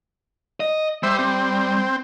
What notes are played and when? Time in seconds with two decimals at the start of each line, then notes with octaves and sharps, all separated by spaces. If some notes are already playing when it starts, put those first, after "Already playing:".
0.60 D#5
1.03 G3 C5 E5
1.19 C4